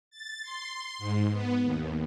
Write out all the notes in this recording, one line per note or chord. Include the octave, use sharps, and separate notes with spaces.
A6
C6
G#2
B3
D#2